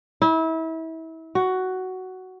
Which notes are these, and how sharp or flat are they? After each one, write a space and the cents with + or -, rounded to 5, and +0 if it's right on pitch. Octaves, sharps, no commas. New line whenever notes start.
E4 -30
F#4 +10